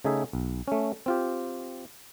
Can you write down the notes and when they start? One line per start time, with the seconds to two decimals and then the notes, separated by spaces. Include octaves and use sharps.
0.05 C#3 A3 D#4 G#4 E5
0.33 B1
0.68 A3 C#4
1.06 C4 F4 G4